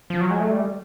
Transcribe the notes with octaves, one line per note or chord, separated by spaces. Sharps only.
F3
F#3
G#3
A3
G3